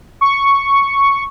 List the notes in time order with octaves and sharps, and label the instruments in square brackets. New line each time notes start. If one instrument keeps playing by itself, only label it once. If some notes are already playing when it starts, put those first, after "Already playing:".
[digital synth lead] C#6